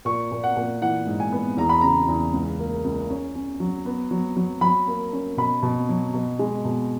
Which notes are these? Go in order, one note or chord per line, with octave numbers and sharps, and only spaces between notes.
A#2 C#6
A#2
F#5
A#2
E3 F#5
G#2
G#5
B3
E2 A#5
B5
C#3 A#5
E2
C#2
A#3
C#2
C#4
C#4
F#3
B3
F#3
F#3
F#3 B5
A#3
C#4
B2 B5
B2
F#3
B2
G#3
B2